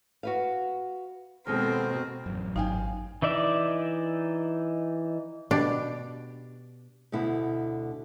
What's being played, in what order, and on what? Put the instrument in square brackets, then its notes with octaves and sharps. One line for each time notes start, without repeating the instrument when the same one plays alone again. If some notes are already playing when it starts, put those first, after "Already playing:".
[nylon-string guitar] F#4 B4 F5
[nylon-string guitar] D#2 G#3 A4 [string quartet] B2 C4 [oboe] A#4
[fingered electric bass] A1 F#2
[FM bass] G#1 [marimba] D#4 [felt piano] F5 G5 G#5
[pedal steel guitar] E3 D#4 D5 E5
[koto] B2 D4 G4
[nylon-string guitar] D2 B2 D3 E4